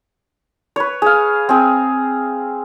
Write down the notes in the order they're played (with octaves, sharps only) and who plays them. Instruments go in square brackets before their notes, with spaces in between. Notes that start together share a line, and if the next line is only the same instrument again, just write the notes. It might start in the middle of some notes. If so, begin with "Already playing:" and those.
[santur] B4 C#5
G#4 F5
C4 G#4